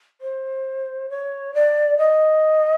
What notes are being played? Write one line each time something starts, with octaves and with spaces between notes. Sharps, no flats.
C5
C#5
D5
D#5